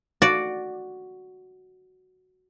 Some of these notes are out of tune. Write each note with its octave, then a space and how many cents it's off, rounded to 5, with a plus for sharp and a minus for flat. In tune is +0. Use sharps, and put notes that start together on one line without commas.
F#4 +0 D5 +0